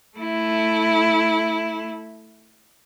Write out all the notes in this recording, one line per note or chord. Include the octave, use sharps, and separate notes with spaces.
A3 E4